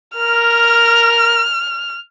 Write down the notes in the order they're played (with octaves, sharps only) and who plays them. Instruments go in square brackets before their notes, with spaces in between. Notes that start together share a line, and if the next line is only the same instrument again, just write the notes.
[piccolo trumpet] A#4 [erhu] F6